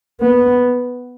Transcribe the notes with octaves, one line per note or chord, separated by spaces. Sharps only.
B3